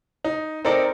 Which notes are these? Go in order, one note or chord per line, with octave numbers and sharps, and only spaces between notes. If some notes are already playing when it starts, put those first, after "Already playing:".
D#4
C4 D#4 A4 A#4 D5